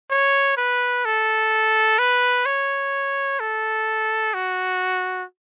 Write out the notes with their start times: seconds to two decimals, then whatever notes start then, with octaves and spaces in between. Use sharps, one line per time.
0.10 C#5
0.57 B4
1.05 A4
1.99 B4
2.46 C#5
3.40 A4
4.34 F#4